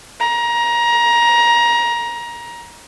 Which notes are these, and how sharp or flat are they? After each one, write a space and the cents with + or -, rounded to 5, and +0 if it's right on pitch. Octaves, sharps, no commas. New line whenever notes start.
A#5 +20